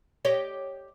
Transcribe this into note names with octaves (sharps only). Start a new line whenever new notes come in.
G4 C#5 D#5